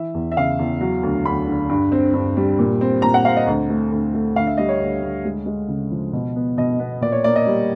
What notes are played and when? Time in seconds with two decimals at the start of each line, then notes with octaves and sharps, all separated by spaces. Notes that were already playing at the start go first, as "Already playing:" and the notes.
Already playing: E3 E5
0.14 E2
0.32 E5
0.37 C#3 F5
0.59 E2
0.81 F#3
1.03 D2
1.25 D2 B5
1.48 D3
1.69 G2
1.92 C4
2.14 G2
2.37 G3
2.59 A#2
2.81 C4
3.02 A#2 A#5
3.14 F#5
3.25 C4 F5
3.37 D#5
3.47 D2
3.69 A3
3.92 D2
4.14 A3
4.36 D2 F5
4.47 E5
4.57 G3 D#5
4.69 C#5
4.80 D2
5.02 D2
5.25 G#3
5.46 G#3
5.68 C#3
5.91 F3
6.13 B2
6.36 B3
6.57 B2 D#5
6.79 B3
7.01 A#2 D5
7.12 C#5
7.24 A#3 D5
7.36 D#5
7.47 G3